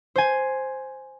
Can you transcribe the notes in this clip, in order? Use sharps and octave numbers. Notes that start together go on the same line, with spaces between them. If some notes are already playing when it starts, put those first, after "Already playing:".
C5 G#5